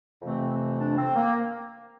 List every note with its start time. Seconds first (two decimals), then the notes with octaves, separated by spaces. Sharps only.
0.22 F2 C3 E3 A3 C4
0.50 C4
0.78 D4
0.96 C4
1.16 A#3